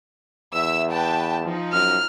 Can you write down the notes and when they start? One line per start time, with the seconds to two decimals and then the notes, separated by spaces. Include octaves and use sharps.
0.54 E2 E5 E6
0.91 B4 G5 A5
1.44 F3 D#4
1.73 F#2 F6